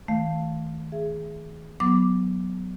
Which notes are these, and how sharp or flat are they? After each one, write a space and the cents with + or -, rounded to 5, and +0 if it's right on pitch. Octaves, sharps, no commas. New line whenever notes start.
D#3 +40 A3 -10 F5 +0
G#4 +0 E5 +20
F#3 +0 B3 +0 D6 +0